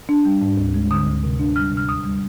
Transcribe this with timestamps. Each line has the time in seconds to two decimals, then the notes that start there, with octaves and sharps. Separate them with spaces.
0.09 D4
0.25 G3
0.41 G#2
0.57 D2
0.74 G#3
0.91 D3 D#6
1.06 D2
1.24 C3
1.39 D4
1.56 G3 F6
1.72 C3
1.77 F6
1.89 D#2 D#6
2.05 G3